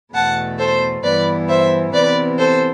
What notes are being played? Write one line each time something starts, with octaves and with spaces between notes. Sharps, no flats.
E2 B2 A3 F#5 A5
A4 C5
G2 E3 B3 B4 D5
C5 E5
C3 E3 B3 B4 D5
A4 C5